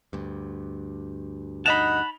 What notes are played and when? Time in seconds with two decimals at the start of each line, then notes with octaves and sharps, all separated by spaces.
0.13 D2 G2
1.66 D#4 F#5 A5 B5 F7